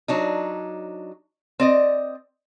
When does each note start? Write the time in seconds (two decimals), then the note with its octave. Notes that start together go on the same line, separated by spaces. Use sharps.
0.08 F#3 D4 D#4
1.60 C4 D5 D#5